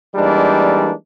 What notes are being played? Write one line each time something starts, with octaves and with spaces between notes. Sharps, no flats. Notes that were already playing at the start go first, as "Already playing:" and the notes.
E3 G3 G#3 A#3 D4 D#4